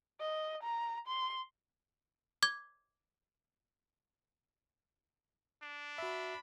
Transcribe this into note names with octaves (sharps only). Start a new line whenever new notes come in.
D#5
A#5
C6
D6 G#6
D4
F#4 E5 B5